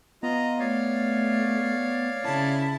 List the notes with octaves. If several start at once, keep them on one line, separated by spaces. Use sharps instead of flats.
B3 F4 D#5 A#5
A3 C#5 D5 F5
C#3 E4 A5